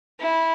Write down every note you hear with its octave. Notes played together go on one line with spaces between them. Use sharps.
E4